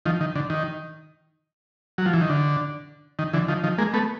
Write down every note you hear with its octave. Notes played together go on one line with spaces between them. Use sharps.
D#3 F3
D#3
D3
D#3
F#3
F3
E3
D#3
D3
D#3
D3 E3
D#3 F3
D#3 F3
G#3 A#3
A3 B3